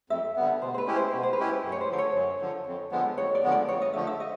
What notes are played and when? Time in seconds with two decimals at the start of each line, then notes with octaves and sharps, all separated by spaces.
0.10 F2 E5
0.36 D3 G3 B3
0.61 B2 C5
0.74 C5
0.78 B4
0.86 G#3 C#4 E4 G4
0.96 C5
1.13 B2 B4
1.23 C5
1.33 B4
1.38 G#3 C#4 E4 G4
1.63 F#2
1.72 C#5
1.81 C5
1.89 D3 F3 D5
1.98 C#5
2.14 F#2
2.40 D3 F3
2.66 F2
2.92 D3 F3 G#3 B3
3.17 F2 C#5
3.35 D5
3.43 D3 F3 G#3 B3
3.52 D5
3.68 F2 C#5
3.82 D#5
3.93 D3 F3 A3 E5
4.07 E5
4.20 D#5